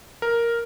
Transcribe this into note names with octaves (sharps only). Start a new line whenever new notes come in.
A#4